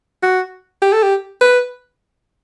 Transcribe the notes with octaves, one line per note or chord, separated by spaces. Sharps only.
F#4
G4
A4
G4
B4